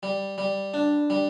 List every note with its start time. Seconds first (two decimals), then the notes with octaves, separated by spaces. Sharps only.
0.03 G3
0.38 G3
0.74 D4
1.10 G3